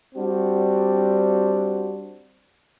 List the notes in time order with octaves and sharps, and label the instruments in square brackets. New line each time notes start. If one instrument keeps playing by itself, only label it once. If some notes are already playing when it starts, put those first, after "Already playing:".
[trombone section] G3 C4 D4 F#4